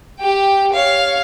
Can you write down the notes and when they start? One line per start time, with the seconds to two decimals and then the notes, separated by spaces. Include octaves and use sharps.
0.19 G4 G5
0.72 C#5 F5